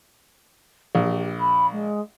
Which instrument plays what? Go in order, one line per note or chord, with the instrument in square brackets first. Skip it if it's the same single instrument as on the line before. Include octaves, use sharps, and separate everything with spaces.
[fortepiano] A#1 [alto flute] G4
[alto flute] B5
G#3